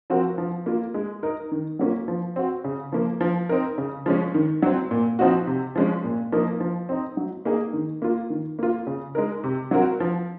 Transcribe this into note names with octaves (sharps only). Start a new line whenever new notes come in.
F3 C4 F#4 A#4
F3
A#3 F4 A#4
G#3
D#4 A#4
D#3
F#3 A#3 C#4 F4
F3
C4 F#4
C#3
F3 A#3
F3
C4 D#4 A#4
C#3
F3 G#3 C#4
D#3
F#3 C4
A#2
F3 C4 D#4 F#4
C3
F3 G#3 C#4
A#2
F3 A#3 D#4 A#4
F3
C4 D#4
F#3
A#3 D#4 G#4
D#3
A#3 F4
D#3
A#3 F4
C#3
G#3 D#4 A#4
C3
F#3 C4 F#4 A#4
F3